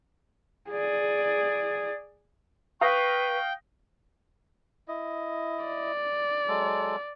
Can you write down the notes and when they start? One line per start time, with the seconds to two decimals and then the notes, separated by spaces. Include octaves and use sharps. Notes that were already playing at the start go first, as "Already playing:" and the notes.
0.70 G#4 D5
2.81 B4 F5 G5 C#6 D#6 A#6
4.88 E4 D#5
5.65 D5
6.48 F#3 G#3 A4